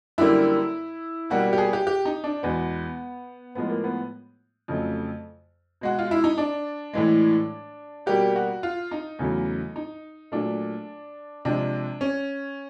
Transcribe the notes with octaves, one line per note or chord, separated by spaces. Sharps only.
F#2 D3 G3 A#3 E4
B2 G3 A#3 F#4
G4
G#4
G4
G4
D#4
D4
E2 B2 G#3 B3
A2 F3 G#3 B3
A#3
B3
F2 C#3 F#3 A3
B2 G#3 F#4
F4
E4
D#4
D4
A2 E3 G#3
B2 G3 A#3 G4
F#4
F4
D#4
E2 C#3 F#3 A3
D#4
A#2 F#3 A3 D4
C3 F3 G#3 D4
C#4